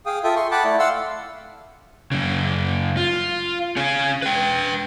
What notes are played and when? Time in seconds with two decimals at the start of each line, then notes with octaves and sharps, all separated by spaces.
0.06 G#4 F5 G5 D#6
0.24 F4 A4 E5 G5 D#6
0.36 C6 C#6
0.51 F#5 G5 A5 B5 D6
0.64 A3 E4 D5
0.79 F5 F#5 C6 E6
2.12 F#2 C#3
2.97 F4
3.77 C#4 G#4
4.22 B4 G5